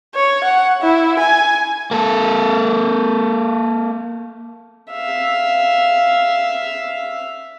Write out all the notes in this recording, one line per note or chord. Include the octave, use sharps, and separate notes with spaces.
C#5
F#5
E4
G#5
A#3 A4
E5 F5